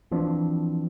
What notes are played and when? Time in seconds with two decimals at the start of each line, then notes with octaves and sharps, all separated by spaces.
0.11 E3 F3 C4 D4